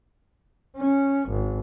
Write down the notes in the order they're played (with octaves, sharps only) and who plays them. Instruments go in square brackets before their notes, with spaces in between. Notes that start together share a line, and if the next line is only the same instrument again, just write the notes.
[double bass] C#4
G#1